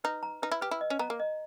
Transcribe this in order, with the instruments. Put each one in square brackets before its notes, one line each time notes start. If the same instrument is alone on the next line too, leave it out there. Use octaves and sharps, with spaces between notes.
[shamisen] D#4 [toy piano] B4
[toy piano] A#5
[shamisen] D#4 [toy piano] B4
[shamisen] E4
[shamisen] G4 [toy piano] B4
[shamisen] E4
[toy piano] D#5
[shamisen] C#4
[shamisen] B3 [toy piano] A#5
[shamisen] A#3
[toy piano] D#5